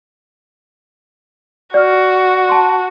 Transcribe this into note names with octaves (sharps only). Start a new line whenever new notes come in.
F#4 D5 F6
A5 C6